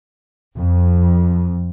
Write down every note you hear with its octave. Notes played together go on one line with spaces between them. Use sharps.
F2